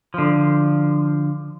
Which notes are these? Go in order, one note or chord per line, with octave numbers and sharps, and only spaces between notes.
D3 F3